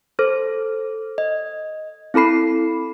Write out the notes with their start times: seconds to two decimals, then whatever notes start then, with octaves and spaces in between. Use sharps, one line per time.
0.19 A4 C5
1.18 D#5
2.14 C4 E4 A4 B5 C7